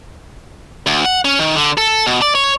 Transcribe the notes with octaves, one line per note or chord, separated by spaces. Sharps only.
D2
F#5
C#4
D#3
D3
A4
B2
D5
C#5